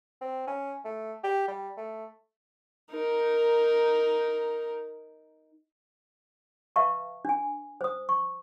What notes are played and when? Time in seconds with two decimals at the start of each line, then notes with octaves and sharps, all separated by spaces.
0.22 C4
0.47 C#4
0.85 A3
1.24 G4
1.48 G3
1.77 A3
2.91 D#4 A#4
6.76 B4 E5 F5 A5 C#6
7.25 D4 G#5
7.81 C5 D#6
8.09 C#6